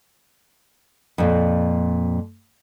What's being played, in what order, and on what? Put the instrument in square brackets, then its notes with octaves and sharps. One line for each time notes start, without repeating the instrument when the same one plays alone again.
[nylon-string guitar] F2 A#2